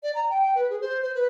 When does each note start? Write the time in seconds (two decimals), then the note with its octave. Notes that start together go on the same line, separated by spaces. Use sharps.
0.03 D5
0.15 A#5
0.30 G5
0.42 G5
0.55 B4
0.70 G#4
0.81 C5
1.02 C5
1.15 B4